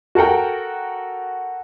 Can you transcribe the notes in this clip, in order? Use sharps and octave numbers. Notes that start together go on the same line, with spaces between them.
F#4 A4 A#4 F#5 G5